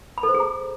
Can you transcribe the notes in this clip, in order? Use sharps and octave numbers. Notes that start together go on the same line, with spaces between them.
B5
A4
C5
G#4
A#5